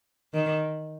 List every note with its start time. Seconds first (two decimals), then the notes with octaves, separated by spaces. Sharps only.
0.33 D#3